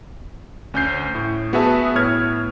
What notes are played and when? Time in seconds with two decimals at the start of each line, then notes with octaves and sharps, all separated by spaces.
0.74 D2 C#4 C#5 G6 C7
1.15 A2
1.53 B3 F#4 G#4 B4 E5 A5
1.95 A2 B3 C#5 F6 G#6